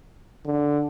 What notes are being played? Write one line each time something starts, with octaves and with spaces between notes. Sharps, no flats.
D3